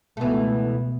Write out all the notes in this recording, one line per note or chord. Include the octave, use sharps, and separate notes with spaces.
C#2 B2 E3 A3 B3